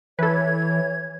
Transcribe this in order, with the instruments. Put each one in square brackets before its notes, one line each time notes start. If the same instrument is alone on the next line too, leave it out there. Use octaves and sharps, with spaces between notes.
[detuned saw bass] E3 [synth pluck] A4 B4 [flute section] C#5 G#6